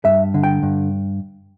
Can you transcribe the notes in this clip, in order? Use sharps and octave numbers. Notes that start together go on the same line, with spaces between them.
G2 E5
D3
G5
G2